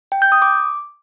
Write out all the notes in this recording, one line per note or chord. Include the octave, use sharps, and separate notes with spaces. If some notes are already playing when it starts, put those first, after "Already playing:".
G5
G6
D#6
D6